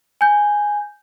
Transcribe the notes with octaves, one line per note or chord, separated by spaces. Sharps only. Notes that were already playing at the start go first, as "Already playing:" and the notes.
G#5 G6